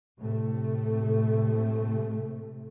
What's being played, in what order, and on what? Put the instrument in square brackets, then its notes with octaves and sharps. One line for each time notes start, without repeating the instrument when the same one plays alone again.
[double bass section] A2 C3 A3